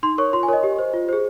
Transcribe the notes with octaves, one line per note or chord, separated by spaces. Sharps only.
D#4 C6
A#4 C#5 C#6
F4 C6
G#5
A#4 C#5 D#5
G4
C5
F4
G#4 C5